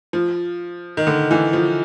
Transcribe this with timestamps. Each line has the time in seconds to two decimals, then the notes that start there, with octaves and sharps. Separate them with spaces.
0.13 F3
0.97 D#3
1.07 D3
1.31 E3
1.53 F3